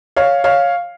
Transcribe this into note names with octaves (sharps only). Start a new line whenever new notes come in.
C#5 F5
C#5 F5